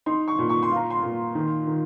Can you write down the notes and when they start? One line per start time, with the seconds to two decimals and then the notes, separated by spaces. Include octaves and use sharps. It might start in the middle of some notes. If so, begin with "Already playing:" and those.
0.06 D#4 C6
0.28 C#6
0.39 A#2
0.49 C#6
0.63 C6
0.71 F4 A#5
0.90 C6
1.02 A#2
1.35 D#3
1.67 D#3